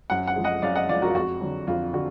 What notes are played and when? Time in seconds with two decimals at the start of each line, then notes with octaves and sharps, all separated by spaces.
0.10 F#2 F#5
0.27 F#5
0.36 F3 G#3
0.44 D#5 F#5
0.62 F#2 D5 F5
0.76 D#5 F#5
0.89 F3 G#3 D5 F5
1.02 F#4 A#4
1.10 F4
1.15 F2 F#4
1.41 D3 F#3
1.67 F2 F4
1.93 D3 F#4